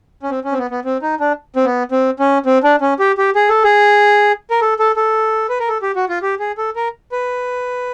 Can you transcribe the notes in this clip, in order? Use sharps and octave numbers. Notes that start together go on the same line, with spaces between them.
C#4
C4
C#4
C4
B3
B3
C4
D#4
D4
C4
B3
C4
C#4
C4
D4
C#4
G4
G4
G#4
A4
G#4
A#4
A4
A4
A4
B4
A#4
A4
G4
F#4
F4
G4
G#4
A4
A#4
B4